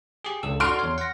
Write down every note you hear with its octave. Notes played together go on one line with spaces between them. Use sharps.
G4 G#4
C#2 A4 E6
F#4 A4 D5 C6 F6 D7
E2 C#5
F#5 A#6